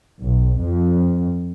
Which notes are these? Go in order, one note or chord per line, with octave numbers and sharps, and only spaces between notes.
B1
F2